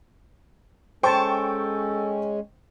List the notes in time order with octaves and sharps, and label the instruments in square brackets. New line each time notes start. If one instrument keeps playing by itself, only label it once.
[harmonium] G#3 C#4 [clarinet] A4 [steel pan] C5 A5 [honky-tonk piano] G5 C#6